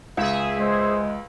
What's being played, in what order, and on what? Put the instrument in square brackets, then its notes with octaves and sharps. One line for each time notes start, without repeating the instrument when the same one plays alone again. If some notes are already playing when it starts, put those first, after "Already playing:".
[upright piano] C#2 [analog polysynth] G#4 E5
[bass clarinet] G#3 [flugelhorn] C5